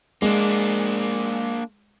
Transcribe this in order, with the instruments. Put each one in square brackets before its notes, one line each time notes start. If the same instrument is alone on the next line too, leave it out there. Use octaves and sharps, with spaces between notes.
[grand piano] G#3 [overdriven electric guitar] A#3 D4